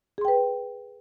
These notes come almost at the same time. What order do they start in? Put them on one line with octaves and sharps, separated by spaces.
G#4 C6 G5 B4